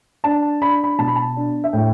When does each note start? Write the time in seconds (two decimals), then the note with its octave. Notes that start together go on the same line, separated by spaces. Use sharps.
0.24 D4 A5
0.62 D4 B5
0.84 B5
0.99 B2 A5
1.08 B5
1.16 A5
1.36 D4
1.64 E5
1.73 A2 G5